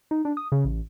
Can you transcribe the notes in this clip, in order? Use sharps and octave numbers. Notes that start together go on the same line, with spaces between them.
D#4
D4
D#6
C#3
A1